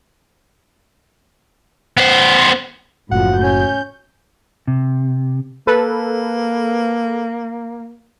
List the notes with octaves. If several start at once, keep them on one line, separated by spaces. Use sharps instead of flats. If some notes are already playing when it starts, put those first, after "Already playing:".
B3 C5
F#1 A2 F3 F#4 F#5
C#4 G6
C3
A#3 A4 B4